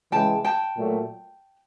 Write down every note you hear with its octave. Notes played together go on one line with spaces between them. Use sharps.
C#3 E3 G#3 G5 A5
G5 A5
A#2 F#3 A3